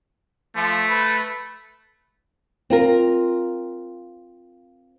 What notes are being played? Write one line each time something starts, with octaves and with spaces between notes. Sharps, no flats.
F3 A3
B4
C4 F4 A#4